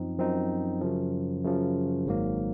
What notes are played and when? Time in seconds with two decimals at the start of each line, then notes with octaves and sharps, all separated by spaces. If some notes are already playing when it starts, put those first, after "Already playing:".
Already playing: F#2 F3 C4 D#4
0.19 F#2 F3 C4 D#4
0.81 F#2 C#3 F3
1.44 F#2 C#3 F3
2.06 G#1 G#2 F#3 A#3